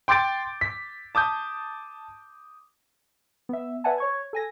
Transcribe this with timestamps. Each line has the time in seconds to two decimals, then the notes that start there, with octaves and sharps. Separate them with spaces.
0.08 G5 C6 D6 G6 A6 D7
0.61 B6
1.15 A5 D6 D#6 G6
3.49 B3 E5
3.84 B4 D5 E5 F#5 G#5 A5
3.98 C#5 C#6 G#6
4.33 A4 G#5 A#6